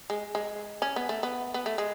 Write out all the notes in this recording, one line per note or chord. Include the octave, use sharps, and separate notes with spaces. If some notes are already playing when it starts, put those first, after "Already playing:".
G#3
G#3
C#4
B3
A3
B3
B3
A3
G#3